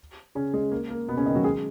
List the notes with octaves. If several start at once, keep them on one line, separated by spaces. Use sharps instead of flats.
C#3 C#4
G#3
A#3
A#3
B2 B3
C#3 C#4
D#3 D#4
F#3 F#4
G#3 G#4